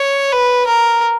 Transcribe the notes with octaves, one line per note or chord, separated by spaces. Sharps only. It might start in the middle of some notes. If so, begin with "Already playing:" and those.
Already playing: C#5
B4
A#4